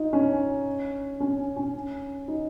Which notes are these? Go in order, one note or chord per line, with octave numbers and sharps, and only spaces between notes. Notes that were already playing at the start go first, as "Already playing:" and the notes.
Already playing: D#4 F4
C#4
C#4
C#4
D#4